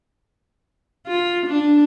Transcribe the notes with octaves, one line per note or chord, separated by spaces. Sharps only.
F4
D4